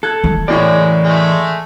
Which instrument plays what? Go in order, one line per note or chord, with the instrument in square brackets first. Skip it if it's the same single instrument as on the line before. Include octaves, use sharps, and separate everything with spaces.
[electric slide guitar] A4 [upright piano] F#6 G#6
[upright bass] E3
[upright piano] F#1 A2 C#5 [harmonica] G#3 [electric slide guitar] D5
[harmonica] G#3 A3